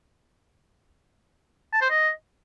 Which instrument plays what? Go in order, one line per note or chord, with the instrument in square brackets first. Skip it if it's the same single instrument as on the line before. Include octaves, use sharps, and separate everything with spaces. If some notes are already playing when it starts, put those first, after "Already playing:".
[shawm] A5
C5
D#5